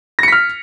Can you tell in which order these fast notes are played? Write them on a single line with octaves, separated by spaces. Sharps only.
A#6 C#7 B6 F6